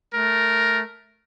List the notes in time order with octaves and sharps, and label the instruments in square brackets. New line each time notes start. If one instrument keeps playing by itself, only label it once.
[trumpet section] A3 A#4